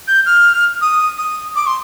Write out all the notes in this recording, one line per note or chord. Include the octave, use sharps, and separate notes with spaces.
G6
F6
D#6
D#6
D6
C6